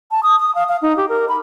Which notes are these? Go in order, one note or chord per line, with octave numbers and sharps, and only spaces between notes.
A5
D#6
D#6
F5
F5
D#4
G4
A#4
B5